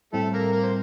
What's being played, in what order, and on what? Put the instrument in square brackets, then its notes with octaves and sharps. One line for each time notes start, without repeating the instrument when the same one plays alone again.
[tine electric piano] A2 G3 C4 E4 [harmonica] A3 A4
[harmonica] A#3 A#4
A#3 A#4
C5